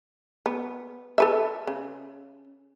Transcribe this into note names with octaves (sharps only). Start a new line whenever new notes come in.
B3
A4 B4 E5
C#3